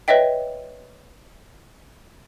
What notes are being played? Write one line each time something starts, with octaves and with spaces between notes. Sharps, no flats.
B4 C#5 D#5 E5 G5